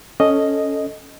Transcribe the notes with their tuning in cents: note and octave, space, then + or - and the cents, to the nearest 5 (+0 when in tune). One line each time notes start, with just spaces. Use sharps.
C#4 +0 A4 +0 D#5 +0